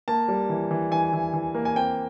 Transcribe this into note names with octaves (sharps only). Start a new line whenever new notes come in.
A#3 A5
G3
E3
E3
E3 G#5
E3
E3
A#3
G#5
C4 G5